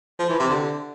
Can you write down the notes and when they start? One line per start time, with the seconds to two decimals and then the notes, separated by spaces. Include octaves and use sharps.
0.19 F3
0.29 E3
0.39 C3
0.50 D3